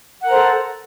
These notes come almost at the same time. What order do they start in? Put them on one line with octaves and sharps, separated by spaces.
F#5 A#4 C5 A4